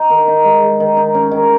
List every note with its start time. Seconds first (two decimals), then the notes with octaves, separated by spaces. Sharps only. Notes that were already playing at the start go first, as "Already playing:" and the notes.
Already playing: D#4
0.10 D#3
0.28 D#4
0.45 G#3
0.63 G#3
0.80 D#3
0.97 D#4
1.15 C#4
1.31 D#3